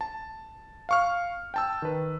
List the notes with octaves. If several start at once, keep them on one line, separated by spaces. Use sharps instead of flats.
A5
F5 C#6 F6
G5 A5 E6
D#3 B4